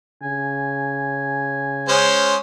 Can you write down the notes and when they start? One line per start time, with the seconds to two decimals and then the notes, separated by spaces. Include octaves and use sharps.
0.22 C#3 G#5
1.89 G#3 C#4 C5